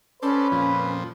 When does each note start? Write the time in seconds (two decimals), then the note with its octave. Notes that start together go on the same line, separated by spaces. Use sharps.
0.23 C#4 A4 B4 C5 D5
0.52 F2 A#2 F3